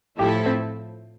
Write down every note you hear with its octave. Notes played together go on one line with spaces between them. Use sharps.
A2 F3 A3 E4 G4 A4
C4